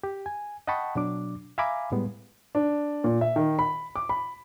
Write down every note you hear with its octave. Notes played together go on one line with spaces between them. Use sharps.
G4
G#5
D#5 F#5 G5 A5 B5 C#6
B2 F#3 D4 D6
E5 F5 G#5 A#5 B5 D6
A2 G3 G#3 B3
D4
A#2
E5
D#3
B5
D6
B5